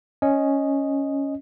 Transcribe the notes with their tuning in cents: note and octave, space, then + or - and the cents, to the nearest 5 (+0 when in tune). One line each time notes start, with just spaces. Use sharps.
C#4 +0 D#5 +0